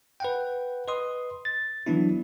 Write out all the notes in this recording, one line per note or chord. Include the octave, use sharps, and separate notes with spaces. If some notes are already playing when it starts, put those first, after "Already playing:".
B4 F#5 G5
B4 D#5 C6 D#6
A6
E3 F#3 B3 D4 E4